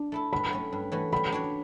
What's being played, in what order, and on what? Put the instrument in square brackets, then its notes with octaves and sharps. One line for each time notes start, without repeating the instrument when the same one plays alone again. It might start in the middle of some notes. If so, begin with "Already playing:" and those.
Already playing: [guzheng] D4
A3 E4 A4
[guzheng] G2 [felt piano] B5
[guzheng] F#3 A3 C#4
G2
E3 A3 C#4 F#4
[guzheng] G3 [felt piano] B5
[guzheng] D4 F#4 C#5